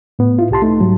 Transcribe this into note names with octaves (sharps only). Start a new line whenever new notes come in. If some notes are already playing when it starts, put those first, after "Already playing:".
A2 B3
E4 F4
C2 G4 A5 C6
A3 D#4
G#2 F#3 G3